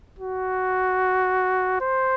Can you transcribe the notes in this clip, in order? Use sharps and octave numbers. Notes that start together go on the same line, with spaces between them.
F#4
C5